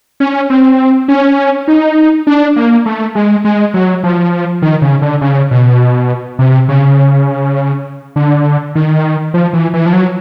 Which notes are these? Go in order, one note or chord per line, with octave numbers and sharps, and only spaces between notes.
C#4
C4
C#4
D#4
D4
A#3
A3
G#3
G#3
F#3
F3
D#3
C#3
D3
C#3
B2
C3
C#3
D3
D#3
F3
E3
E3
F3
F#3